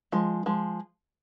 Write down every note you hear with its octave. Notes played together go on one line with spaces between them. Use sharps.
F3 G#3
F3 G#3